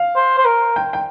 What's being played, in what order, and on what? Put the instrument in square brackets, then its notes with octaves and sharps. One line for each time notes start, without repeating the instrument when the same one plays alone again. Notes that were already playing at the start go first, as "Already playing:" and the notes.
Already playing: [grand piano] F5
[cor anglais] C5
C5
A#4
[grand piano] G5
G5